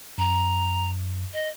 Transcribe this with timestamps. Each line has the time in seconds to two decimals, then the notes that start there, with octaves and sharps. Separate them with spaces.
0.18 F#2 A#5
1.33 D#5